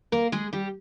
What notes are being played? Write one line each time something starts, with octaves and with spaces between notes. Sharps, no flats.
A#3 A#4
G#3 G#4
G3 G4